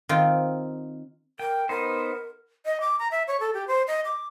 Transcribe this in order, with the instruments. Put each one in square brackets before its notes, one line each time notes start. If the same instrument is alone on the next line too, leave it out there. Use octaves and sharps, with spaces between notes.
[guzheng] D#3 C4 F4
[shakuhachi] A#4 [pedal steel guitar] G5
[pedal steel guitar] B3 D#4 C5 [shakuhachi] A#4
[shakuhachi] D#5
D6
A#5
E5
C#5
A4
G4
C5
D#5
D6